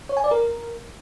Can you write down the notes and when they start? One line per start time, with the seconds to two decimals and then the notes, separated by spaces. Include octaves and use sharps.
0.09 C#5
0.17 G#5
0.24 D5
0.31 A#4